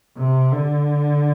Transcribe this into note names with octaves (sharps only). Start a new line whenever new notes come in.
C3
D3